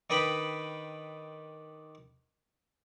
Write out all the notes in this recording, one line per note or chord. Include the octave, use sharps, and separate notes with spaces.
D#3 D4 B4 D#5 G5 B5